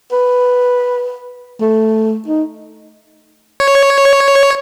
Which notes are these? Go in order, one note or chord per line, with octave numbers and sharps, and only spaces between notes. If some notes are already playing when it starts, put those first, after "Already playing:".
B4
A3
D#4
C#5